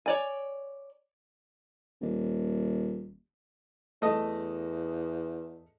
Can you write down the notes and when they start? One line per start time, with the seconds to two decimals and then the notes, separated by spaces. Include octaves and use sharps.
0.06 C#5 D5 G#5
2.01 D#1
4.02 E2 A3 D#5